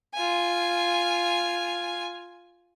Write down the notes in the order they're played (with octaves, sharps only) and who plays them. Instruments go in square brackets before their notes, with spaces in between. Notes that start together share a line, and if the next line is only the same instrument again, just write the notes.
[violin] F4 G#5